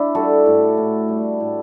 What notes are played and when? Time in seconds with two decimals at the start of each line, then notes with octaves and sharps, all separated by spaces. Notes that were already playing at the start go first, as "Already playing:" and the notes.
Already playing: D4 E4
0.15 G3 F#4 A4
0.46 A2
0.78 A2
1.09 G3
1.40 A2